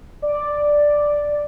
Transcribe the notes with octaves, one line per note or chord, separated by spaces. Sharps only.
D5